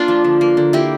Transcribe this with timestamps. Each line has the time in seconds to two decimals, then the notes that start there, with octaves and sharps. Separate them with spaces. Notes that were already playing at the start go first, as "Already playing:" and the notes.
Already playing: A#3 D4 F4
0.08 F3
0.24 D3
0.41 A#3
0.57 D3
0.73 A#3 E4 G4